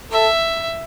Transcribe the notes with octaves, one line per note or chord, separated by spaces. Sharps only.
A4 E5